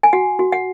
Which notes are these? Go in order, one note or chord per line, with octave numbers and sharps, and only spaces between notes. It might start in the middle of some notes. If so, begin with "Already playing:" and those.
G#5
F#4 F#5
F#4
F#5